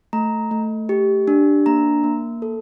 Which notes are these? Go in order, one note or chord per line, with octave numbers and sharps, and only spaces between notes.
A3 A#5
A3
G4
D4
A#3 A#5
A#3
A4